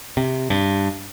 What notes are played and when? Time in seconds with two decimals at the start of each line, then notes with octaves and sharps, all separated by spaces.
0.17 C3
0.50 G2